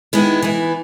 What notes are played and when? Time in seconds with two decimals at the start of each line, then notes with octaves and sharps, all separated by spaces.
0.13 D#3 G#3 B3 E4
0.43 E3 B3 E4